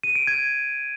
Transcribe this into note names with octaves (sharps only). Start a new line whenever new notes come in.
D#7
D7
G#6